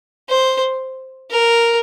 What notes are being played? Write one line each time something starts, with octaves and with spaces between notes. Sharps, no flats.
C5
A#4